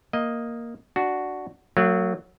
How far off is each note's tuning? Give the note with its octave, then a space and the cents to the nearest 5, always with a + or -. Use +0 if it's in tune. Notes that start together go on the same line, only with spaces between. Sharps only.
A#3 +0 D#5 +0
D4 +0 F#4 +0
F#3 +0 A#3 -45